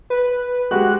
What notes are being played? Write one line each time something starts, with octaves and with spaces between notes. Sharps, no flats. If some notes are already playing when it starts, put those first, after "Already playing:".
B4
G#3 F#4 G4 F#6